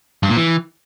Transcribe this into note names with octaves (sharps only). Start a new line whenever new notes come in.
G2
A#2
E3